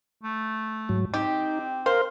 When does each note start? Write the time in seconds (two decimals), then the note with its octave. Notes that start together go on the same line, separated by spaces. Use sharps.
0.23 A3
0.89 G#2 F#3
1.14 C4 D#4 G4
1.86 A#4 C5 F5